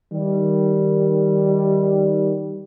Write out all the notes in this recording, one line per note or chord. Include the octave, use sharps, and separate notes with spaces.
D#3 G3